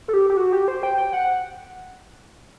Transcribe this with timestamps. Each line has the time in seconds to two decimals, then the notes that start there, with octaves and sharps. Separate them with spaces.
0.08 A4
0.13 G4
0.30 G4
0.37 F#4
0.52 G4
0.68 C5
0.83 G5
0.98 G5
1.13 F#5